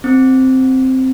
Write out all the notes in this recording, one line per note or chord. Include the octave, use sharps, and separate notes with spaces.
C4